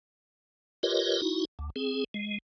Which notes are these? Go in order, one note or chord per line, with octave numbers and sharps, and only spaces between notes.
F4 G4 A#4 B4 C#5 D#5
D#4 E4 F#4
D2
C4 G#4
G#3